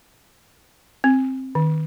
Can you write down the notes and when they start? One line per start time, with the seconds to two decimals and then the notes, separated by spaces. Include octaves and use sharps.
1.04 C4
1.55 D#3